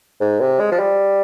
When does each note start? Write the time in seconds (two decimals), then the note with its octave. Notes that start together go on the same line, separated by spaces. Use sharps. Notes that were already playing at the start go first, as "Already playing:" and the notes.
0.21 G#2
0.40 C3
0.60 G#3
0.72 F3
0.79 G3